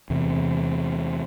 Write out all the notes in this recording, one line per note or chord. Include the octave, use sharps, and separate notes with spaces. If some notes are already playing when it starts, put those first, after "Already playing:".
E2 C3